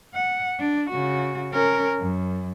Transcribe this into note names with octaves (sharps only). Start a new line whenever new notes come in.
F#5
D4
C#3 F#4
C#4 A#4
F#2